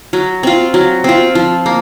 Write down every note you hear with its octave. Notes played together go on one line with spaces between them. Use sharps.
F#3
C4 F4
F#3
C4 F4
F3
A#3